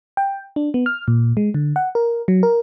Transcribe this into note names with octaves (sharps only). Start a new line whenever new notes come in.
G5
D4
B3
F6
A#2
G#3
D3
F#5
A#4
F#3
A#4